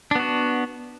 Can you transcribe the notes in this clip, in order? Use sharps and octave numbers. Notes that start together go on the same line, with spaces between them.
B3 D4 F#4